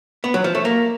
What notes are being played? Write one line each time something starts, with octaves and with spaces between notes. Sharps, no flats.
B3
F#3
F3
A3
A#3